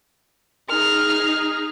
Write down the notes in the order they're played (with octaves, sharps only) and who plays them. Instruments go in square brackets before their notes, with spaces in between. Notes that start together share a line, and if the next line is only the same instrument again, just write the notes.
[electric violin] D#4 G#4 [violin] F6